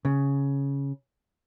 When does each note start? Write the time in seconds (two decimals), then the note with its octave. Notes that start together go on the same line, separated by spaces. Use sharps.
0.05 C#3